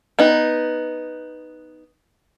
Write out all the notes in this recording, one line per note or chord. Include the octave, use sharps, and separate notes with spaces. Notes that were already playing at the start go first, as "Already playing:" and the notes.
B3 D#4